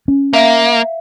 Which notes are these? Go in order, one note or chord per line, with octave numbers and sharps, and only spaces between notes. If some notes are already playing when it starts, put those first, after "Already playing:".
C#4
A#3 E5 F5